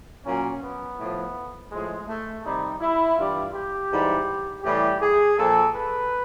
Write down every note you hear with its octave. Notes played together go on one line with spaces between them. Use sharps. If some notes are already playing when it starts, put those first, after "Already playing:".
A#2 F#3 C#4
B3
A2 F3
A2 F3 G#3
A3
C3 D#3 G3 D#4
E4
G2 E3 G3 F4
G4
G#2 E3 G3
A2 E3 G3 G4
G#4
A#2 F3 A4
B4